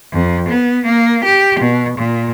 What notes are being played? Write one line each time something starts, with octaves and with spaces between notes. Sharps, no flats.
F2
B3
A#3
G4
B2
A#2